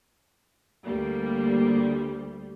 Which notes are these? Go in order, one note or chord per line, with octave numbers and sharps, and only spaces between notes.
D2 G3 A#3